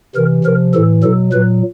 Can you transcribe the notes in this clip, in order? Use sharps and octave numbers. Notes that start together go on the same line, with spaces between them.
C3 E3 A#4
C3 F3 A#4
A2 E3 A4
B2 F#3 A4
A#2 F#3 B4